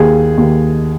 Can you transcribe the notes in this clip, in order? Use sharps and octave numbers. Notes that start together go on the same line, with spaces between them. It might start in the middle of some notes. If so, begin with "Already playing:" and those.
Already playing: D#2 G#4
D#2